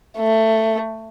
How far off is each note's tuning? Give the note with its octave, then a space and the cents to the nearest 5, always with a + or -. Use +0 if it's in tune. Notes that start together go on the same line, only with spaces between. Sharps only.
A3 +15